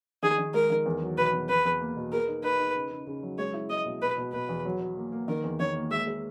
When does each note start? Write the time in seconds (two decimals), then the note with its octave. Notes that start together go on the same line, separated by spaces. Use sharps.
0.23 D#3 G#4
0.38 D#3
0.54 G#3 A#4
0.70 D#3
0.86 E2
1.02 F#3
1.17 B2 B4
1.33 E2
1.49 E2 B4
1.65 E2
1.80 A#3
1.96 B2
2.12 G#4 A#4
2.28 D#4
2.44 D#4 B4
2.59 D#4
2.75 C#3
2.91 C#3
3.07 C#3
3.23 F#3
3.38 G#3 C#5
3.54 E4
3.69 G#3 D#5
3.86 B2
4.02 B2 B4
4.18 B2
4.33 B2 B4
4.49 E2
4.65 F#3
4.81 F#3
4.97 A#3
5.12 A#3
5.28 D#3 A#4
5.44 E2
5.60 D#3 C#5
5.76 A#3
5.91 G#3 E5
6.07 G#3